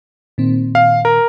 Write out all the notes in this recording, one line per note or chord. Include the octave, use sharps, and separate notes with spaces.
A#2 D#3 C4
F5
A#4